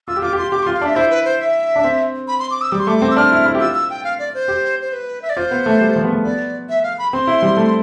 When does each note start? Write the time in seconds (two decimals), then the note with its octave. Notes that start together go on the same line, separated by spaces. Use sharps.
0.08 F4 E6
0.16 G4
0.22 F4 D6
0.33 G4
0.38 F4 C6
0.52 G4 D6
0.63 C6
0.66 F4
0.74 F5
0.81 D4 E5
0.95 E4 C5
1.10 B4
1.25 C5
1.40 E5
1.76 D4
1.84 C4
2.28 B5
2.39 C6
2.51 D6
2.62 E6
2.72 G3 D6
2.80 C6
2.87 A3 D6
3.02 C4
3.11 E6
3.16 D4 F6
3.32 E4
3.46 E4
3.55 G4
3.61 F4 E6
3.75 E6
3.90 G5
4.04 F5
4.19 D5
4.34 C5
4.48 G4
4.81 C5
4.93 B4
5.22 E5
5.30 D5
5.37 F4 C5
5.51 B3
5.66 A3
5.81 G3
5.96 F3
6.04 B3
6.10 A3
6.25 B3 D5
6.69 E5
6.83 F5
6.98 B5
7.13 C4 C6
7.27 E4
7.42 G3
7.57 A3